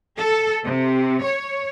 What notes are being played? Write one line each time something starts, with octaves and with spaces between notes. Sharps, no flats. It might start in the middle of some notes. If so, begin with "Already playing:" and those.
A4
C3
C#5